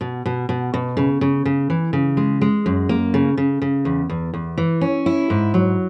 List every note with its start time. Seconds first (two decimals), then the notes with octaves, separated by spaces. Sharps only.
0.01 B2
0.26 B2
0.49 B2
0.74 B2
0.97 C#3
1.21 C#3
1.45 C#3
1.70 E3
1.93 C#3
2.17 G#3
2.41 G#3
2.66 F#2
2.89 A#3
3.14 C#3
3.37 C#3
3.62 C#3
3.85 E2
4.09 E2
4.34 E2
4.58 E3
4.81 C#4
5.06 E4
5.30 G#2
5.54 F#3